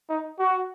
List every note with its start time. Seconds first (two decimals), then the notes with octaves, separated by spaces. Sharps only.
0.09 D#4
0.39 F#4